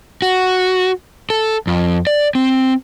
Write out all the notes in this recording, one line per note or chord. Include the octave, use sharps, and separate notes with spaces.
F#4
A4
F2
D5
C4